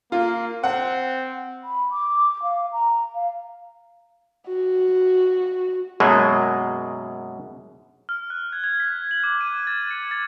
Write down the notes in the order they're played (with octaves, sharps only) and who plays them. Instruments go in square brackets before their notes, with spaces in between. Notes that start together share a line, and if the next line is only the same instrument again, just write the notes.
[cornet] A#3 [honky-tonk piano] F4
[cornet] C4 [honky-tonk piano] F#5
[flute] B5
D6
F5
A#5
F5
[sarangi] F#4
[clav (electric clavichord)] F#2 B2 F#3 G#3 A#3
[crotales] F6
F#6
G#6
G#6
B6
F#7
D6
D#7
A6
C#7
A6